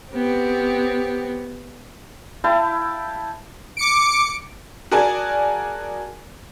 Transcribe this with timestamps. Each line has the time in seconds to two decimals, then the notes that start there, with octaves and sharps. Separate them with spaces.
0.12 B3 C4 G4
2.44 E4 F5 G5 A5
3.77 D6 C#7 D7
4.92 F#4 G#4 A#4 D5 G#5 A5